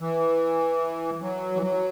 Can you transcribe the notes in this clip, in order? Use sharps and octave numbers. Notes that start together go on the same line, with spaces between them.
E3
F#3
E3
F#3